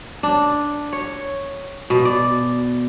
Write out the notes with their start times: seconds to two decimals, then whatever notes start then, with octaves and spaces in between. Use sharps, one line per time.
0.23 D4
0.93 C#5
1.90 B2
2.05 D5